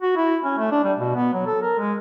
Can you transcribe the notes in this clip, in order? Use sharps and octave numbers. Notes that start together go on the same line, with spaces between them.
F#4
E4
C#4
A3
D4
G3
B2
B3
F#3
A4
A#4
G#3